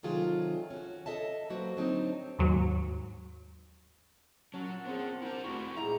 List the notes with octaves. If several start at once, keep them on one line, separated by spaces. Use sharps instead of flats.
C3 D#3 F#3 F4 G#4 A4
C#4 F#4
A4 D#5 E5 A5
F#3 A#3 F#4 B4 C5
A2 D3 F#3 C4 D#4 A5
D#2 G#2 F#3
A#2 F#3 C#4 F#5 A5
B3 C4 G#4
D4 E4 G4 A#4 C5
D2 A3 C4 E4 F#4 C#6
A#2 G3 G#3 D#4 E4 A#5